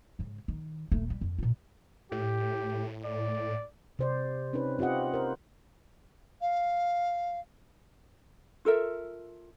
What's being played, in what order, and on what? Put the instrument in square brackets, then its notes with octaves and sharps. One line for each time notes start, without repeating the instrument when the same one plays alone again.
[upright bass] G#2 C#3
D#3
D#1 A3
G3
F2
A#2 F4
[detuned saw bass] A2 [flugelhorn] G4
[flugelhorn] D5
[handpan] C3 C5 D5
C4 C#4 D#4 B4
C4 F4 G4 D#5 F#5
A#4 C5
[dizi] F5
[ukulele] F4 A4 A#4 E5